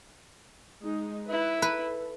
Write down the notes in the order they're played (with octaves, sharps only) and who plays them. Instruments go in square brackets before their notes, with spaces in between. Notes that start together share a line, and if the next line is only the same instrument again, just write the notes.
[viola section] G#3 D#4
[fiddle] E4 [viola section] B4
[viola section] A4 [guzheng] B4